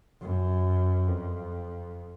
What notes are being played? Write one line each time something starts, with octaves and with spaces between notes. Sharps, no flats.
F#2
F2